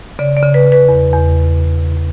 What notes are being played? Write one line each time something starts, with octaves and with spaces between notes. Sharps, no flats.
C#3 D5
D5
C#3
B4
C#3
B4
E2
E2